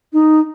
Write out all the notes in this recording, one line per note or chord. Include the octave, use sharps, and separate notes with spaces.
D#4